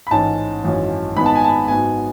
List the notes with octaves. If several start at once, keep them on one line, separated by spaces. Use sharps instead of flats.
B5
A1 G#2 G#3 C#4 A5
G#1 F#2 E3 G#3 C#4
G#1 G#2 G#3 B3 B5
A5
G#5
A5
G#2 F#3 B3 G#5